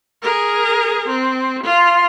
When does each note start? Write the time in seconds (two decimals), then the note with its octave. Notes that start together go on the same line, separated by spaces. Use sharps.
0.23 G#4 A#4
1.08 C4
1.64 F4 C6